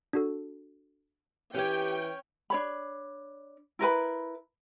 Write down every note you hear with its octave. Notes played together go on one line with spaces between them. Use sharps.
D4 F#4 A4
E3 C#4 G4 C#5 G5
D4 C#5 B5
E4 A#4 B4 B5